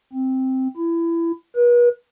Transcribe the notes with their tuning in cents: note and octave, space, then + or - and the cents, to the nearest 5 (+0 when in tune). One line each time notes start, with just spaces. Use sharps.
C4 +0
E4 +25
B4 -40